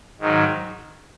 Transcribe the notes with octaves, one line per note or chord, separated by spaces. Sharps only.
G#2 D#3 F#3